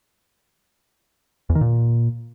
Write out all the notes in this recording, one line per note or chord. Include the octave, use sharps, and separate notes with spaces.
E2
D#3
A#2